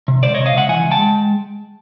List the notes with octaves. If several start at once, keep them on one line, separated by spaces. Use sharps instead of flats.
C3
C#2 C5 D5
C3 C#5 D#5
D#5 F5
C#2 E5 F#5
E3 F#5 G#5
C#2
G5 A5
G#3